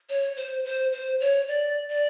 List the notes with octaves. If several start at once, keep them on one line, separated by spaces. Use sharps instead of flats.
C#5
C5
C5
C5
C#5
D5
D5